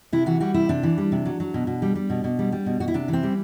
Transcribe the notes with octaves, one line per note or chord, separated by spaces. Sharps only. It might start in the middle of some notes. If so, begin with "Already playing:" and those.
C3 E4
E3 F#4
G3 F#4
C3 E4
C3 D4
E3
G3
C3
F#3
F#3
B2
B2
G3
G3
B2
B2
G3
G3
B2
B2 F#4
E4
C3 D4
E3
C4
G3